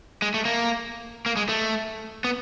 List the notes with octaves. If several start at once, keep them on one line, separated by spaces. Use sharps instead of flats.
G#3
A3
A#3
A#3
G#3
A3
B3